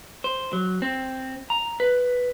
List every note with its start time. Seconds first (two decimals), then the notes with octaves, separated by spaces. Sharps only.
0.24 C5
0.53 F#3
0.82 C4
1.50 A#5
1.80 B4